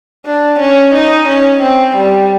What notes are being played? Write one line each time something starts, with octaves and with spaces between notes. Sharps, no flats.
D4
C#4
D#4
C#4
C4
G3